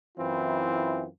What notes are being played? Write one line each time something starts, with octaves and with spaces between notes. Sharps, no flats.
F#2 E3 C4 E4 F4